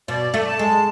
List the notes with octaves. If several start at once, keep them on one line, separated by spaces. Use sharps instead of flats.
B2 D5
A3
A5
G#3